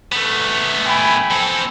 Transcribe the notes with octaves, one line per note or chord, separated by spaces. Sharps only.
A3 B3
G5 G#5 B5
C4 A4